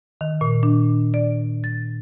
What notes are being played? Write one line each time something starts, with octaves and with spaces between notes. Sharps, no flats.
D#3
A#2
D4
D5
A6